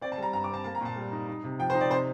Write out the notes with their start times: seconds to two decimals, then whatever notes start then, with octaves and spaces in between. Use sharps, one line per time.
0.01 C4 D5
0.12 A5
0.18 G3 A#5
0.33 G2 A#5
0.44 D6
0.49 C4 A5
0.64 A#3 A5
0.75 A#5
0.81 A#2 A5
0.96 G3
1.12 D#4
1.28 D#4
1.44 C3
1.59 F3 G5
1.70 C5
1.74 D#4
1.81 D5
1.90 C3 C5